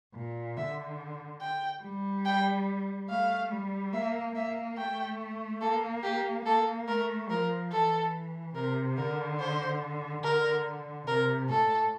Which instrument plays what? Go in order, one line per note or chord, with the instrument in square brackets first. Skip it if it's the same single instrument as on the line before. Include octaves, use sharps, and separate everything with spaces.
[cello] A#2
[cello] D3 [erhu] E5
[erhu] G5
[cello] G3
[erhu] G5
[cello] A3 [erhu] F5
[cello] G3
[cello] A#3 [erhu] E5
[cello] A#3 [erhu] E5
[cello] A3 [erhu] G5
[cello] A#3 [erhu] A4
[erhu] G4
[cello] A#3 [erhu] A4
[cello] A3 [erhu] A#4
[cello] F3 [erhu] A#4
[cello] E3 [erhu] A4
[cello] C3 [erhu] A#4
[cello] D3 [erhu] A#4
[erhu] C5
[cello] D3 [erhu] A#4
[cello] C3 [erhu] A#4
[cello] A2 [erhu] A4